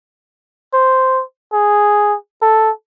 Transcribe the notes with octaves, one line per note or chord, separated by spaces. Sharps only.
C5
G#4
A4